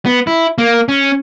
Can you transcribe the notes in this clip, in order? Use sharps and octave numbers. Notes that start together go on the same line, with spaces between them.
B3
E4
A#3
C#4